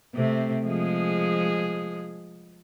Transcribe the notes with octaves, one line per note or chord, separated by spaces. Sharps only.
C3 A3 C4
F3 G#3 G#4